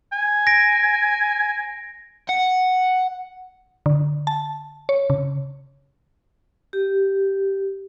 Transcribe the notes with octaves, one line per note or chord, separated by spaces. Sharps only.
G#5
A#6 D7
F#5
D3
A5
C#5
C#3
G4